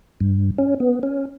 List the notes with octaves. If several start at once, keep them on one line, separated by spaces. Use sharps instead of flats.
G2
C#4
B3
C#4